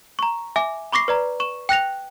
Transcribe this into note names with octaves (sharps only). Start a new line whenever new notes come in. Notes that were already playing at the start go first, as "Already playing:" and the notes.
A#5 C#6
E5 G#5 D6
B5 C#6 D6 A#6 C7
B4 D5 A#5
C#6 E7
G5 F#6 A#6 F7